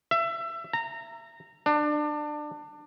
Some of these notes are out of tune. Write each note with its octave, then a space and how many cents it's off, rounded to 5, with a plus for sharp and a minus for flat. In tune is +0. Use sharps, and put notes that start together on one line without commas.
E5 +25
A#5 -20
D4 +25